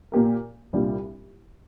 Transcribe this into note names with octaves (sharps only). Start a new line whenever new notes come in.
A#2 A#3 G4 A#4
C2 A#2 G3 D4 F4